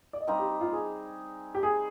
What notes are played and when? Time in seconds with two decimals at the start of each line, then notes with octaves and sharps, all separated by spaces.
0.13 D5
0.21 D#5
0.27 G3 C4 D#4 F5
0.39 G4
0.61 F4
0.73 G#4
1.55 G4
1.63 G#4